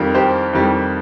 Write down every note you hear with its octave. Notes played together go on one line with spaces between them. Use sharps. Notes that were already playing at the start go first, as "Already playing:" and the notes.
Already playing: F2 D#3 G3 F4 A#4
G4 C5
F2 D#3 G3